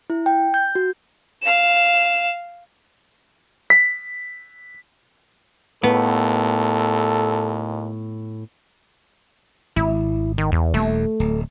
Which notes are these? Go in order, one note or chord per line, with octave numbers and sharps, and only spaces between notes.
E4
G5
G6
F#4
F5 E7
B6
D#2 A2 B3 A4
G#1 E4
D#3
E2
D#1 D#2 A3
D1